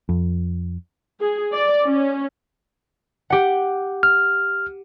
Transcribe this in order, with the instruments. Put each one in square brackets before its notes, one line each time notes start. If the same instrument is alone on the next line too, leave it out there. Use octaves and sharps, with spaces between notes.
[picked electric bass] F2
[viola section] G#4
D5
C#4
[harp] G4 F#5
[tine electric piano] F6